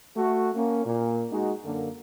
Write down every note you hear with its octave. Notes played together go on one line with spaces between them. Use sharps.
A3 F#4
A#3 C#4
A#2
G#3 D#4 F#4
F#2 D3 A#3